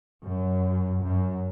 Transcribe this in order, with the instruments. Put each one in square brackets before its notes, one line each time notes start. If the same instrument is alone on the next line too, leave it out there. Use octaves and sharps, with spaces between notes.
[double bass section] F#2
F#2